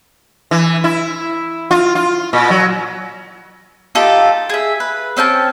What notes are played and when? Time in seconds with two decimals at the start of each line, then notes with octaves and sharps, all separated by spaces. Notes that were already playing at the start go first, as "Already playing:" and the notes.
0.51 E3
0.84 E4
1.71 F4
1.95 F4
2.33 A#2
2.50 F#3
3.95 D#4 F4 G4 A4
4.49 G#4 E5
4.80 B4
5.17 C4 C#4 G5 A5